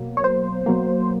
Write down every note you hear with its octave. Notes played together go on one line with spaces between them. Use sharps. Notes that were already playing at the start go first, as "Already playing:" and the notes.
Already playing: B2 F#3 A#3
C#5
C5
B2 F#3 A#3